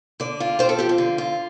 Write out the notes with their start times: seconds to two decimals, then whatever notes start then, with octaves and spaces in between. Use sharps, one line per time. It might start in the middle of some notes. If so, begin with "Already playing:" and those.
0.20 D3 D5
0.40 F4
0.59 C4 C5
0.69 A4
0.79 F3 G4
0.89 F4
0.98 D3
1.18 F4